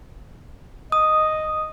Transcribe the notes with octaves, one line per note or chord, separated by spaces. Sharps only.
D#5 D#6